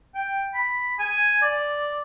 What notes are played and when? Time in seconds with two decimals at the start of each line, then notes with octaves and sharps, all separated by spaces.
0.15 G5
0.54 B5
0.99 G#5
1.42 D5